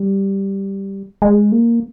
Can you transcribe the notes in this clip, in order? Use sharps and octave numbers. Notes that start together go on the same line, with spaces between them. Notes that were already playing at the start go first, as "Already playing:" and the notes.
Already playing: G3
G#3
A#3